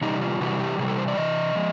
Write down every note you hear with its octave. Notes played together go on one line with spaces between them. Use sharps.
C3 E3 G3 D#4
F4
C3 E3 G3 F#4
G4
C3 E3 G3 G#4
A4
C5
D5
C3 E3 D#5
F3 G#3